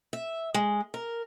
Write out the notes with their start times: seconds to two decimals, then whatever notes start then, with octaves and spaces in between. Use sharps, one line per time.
0.13 E5
0.54 G#3
0.94 A#4